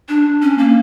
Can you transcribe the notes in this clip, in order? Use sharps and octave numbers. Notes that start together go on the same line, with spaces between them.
D4
C#4
A#3